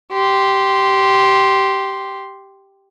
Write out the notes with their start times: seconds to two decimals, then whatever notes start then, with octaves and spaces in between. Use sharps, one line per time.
0.12 G4 C6